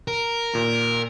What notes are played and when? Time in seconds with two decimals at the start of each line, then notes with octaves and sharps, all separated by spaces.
0.08 A#4
0.53 D#2 A#2